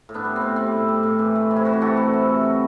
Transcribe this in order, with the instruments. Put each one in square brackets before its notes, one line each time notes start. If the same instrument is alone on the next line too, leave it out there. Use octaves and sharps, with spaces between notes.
[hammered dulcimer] A2
B3 D4
G3
C4
A2
G3 C4
A2
G3
A2
E3
A3
C3
E4
C3 F#4
G4
E3 F#4 A4
A3
C3
C3
F#3